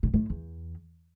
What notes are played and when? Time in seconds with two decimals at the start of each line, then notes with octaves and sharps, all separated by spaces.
0.03 A#2
0.14 A2
0.30 E2